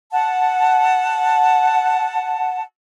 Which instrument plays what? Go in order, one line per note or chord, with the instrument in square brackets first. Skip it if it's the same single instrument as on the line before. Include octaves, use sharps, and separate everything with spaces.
[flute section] F#5 A5